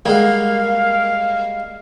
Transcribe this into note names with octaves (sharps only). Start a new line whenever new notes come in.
G3 G#3 A#3 F#4 F5